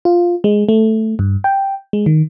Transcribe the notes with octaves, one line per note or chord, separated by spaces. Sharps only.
F4
G#3
A3
G2
G5
G#3
D#3